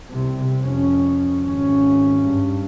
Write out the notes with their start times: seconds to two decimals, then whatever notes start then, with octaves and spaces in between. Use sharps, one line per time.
0.11 C2 C3
0.62 F2 C#4
1.43 G#1 C#4
2.26 G2